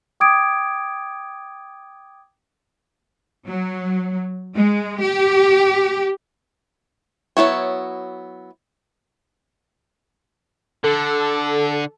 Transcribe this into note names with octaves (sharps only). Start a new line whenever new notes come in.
G5 D6 D#6 G#6 D7
F#3
G#3
G4
F#3 B3 E4 C#5
D3 A4